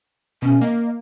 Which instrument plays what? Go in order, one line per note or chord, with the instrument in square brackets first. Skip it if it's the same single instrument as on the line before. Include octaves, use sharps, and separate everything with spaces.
[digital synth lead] B2 [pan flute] C#4
[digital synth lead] A#3 [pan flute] D#5